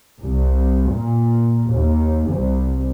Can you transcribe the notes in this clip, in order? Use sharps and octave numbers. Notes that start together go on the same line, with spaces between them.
C2
A#2
D#2
C2